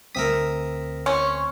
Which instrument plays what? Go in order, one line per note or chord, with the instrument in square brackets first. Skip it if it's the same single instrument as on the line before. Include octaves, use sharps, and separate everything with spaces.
[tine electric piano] D2 C4 B6 [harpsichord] A#4 E5 D#6
[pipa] C#4 [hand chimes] C#5 C6 C#6